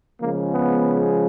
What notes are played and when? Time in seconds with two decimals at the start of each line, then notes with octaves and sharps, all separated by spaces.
0.21 C#3 F3 G#3 A#3
0.53 B3